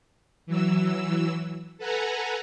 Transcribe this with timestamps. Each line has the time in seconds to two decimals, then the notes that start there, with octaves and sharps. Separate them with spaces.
0.46 E3 F#3 E6
1.78 A4 B4 F#5 G#5 A#5